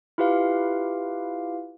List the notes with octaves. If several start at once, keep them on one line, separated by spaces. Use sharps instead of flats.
E4 F4 G4 B4 F5